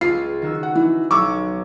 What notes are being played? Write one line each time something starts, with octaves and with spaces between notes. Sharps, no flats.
C#2 F4 C7
D#3 F#4 E6
F#5
E3
B1 C#6 D6 E6